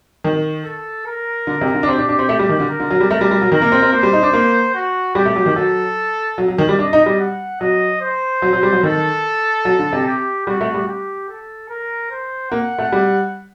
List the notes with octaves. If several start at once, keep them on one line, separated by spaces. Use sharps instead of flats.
D#3
A4
A#4
D3
C3
D3
D4
C4 G4
D4
D4
C4
A3
G3
D#3
D3
A#4
D3
F#3
G3
A3 A#4
G3
G3
F#3
D#3 A#4
A#3
C4
C4
A#3 C5
G3
D#4
D4
A#3
F#4
G3 G4
A3
F#3
D#3
F#3 A4
F#3
F#3
D#3
G3
D4 D#5
D#4
G3
F#5
F#3 D#5
C5
F#3
F#3
G3
F#3
D#3 A4
F#3
D3
C3
G4
G3 F#4
A3
G3
G4
A4
A#4
C5
A#3 F#5
A3
G3